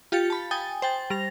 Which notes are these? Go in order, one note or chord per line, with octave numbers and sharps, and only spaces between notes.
F4 G4 F5 A6 C#7
A5 B5
G5 G#5 D#6 A6
C5 G5 A6
G3 A#6 F7